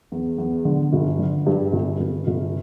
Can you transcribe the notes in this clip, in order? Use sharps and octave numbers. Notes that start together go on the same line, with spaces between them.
E2
E2
D3
G1
D3
G2
G1
G1
G1